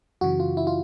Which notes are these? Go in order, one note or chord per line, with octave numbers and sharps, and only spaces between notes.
F#2 C#3 E3 F#4
F4
E4
F4